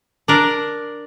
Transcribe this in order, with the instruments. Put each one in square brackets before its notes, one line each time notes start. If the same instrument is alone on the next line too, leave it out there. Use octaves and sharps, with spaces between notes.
[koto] D4 A#4